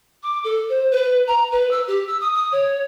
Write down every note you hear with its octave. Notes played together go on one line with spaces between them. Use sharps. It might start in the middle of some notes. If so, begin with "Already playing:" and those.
D6
A4
C5
B4
A#5
B4
E6
G4
E6
D#6
D#6
C#5